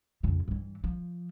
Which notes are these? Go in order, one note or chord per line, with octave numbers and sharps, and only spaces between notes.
F2 C#3
G2 E3
F3